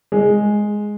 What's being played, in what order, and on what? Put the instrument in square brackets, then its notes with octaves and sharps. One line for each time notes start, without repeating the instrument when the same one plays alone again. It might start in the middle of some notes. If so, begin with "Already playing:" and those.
[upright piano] G#3